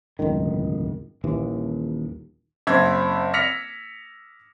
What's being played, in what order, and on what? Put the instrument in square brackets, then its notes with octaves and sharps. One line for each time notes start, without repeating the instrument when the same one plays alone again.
[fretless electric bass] D1 G1 C#2 D#3
D#1 A#1 D#2 E3
[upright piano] F#1 C4 E5 E6 G#6
E6 F6 A#6 B6 C#7 F7